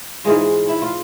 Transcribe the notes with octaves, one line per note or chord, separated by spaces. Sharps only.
G#2 E3 G#3 F4 G#4
E4
F4